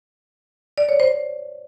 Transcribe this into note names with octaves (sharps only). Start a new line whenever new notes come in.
D5
C#5
C5